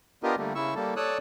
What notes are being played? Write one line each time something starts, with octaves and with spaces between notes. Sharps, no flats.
B3 D4 F4 G4 A#4 D#5
D3 G3 A3 A#3
C#3 E4 C#6 E6
G3 A#3 A4
A4 C#5 D5 D#6 E6 F#6